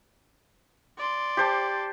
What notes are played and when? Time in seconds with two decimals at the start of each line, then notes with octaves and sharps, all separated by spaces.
0.97 D5 C6
1.37 G4 C5 A5